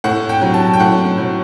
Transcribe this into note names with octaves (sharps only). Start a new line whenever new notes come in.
A2 F#5
G5
F#3
A5
G5
A2 F#5
F#3